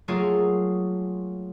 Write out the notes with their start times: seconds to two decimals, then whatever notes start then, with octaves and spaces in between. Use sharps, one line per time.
0.08 F#3 A3 A#3 F4 G#4